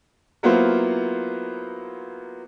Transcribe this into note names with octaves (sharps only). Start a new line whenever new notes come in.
F#3 A#3 B3 E4 F4 C5